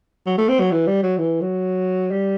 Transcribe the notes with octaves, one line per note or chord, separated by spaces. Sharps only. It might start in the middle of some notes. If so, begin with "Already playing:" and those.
F#3
A3
C4
F#3
E3
G3
F#3
E3
F#3
G3